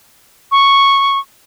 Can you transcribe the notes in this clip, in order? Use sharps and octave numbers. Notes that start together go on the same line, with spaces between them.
C#6